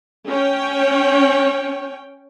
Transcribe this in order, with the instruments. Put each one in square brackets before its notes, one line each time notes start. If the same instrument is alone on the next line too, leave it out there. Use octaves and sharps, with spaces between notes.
[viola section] C#4 C#5 G5